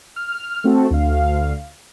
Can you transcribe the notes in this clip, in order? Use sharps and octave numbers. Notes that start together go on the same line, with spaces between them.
F6
A3 C4 F#4 A4
D2 F5